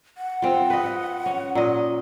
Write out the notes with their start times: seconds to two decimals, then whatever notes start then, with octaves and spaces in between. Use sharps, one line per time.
0.18 F#5
0.42 C4 F4
0.70 B4 D#5
1.26 C#4
1.55 A#2 D#5